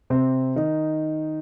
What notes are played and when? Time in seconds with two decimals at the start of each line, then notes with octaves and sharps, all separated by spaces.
0.10 C3 C4
0.56 D#3 D#4